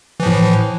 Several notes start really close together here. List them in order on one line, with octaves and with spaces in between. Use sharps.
E3 F3 A2